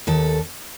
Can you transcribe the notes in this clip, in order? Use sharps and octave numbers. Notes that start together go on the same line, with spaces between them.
D#2 A4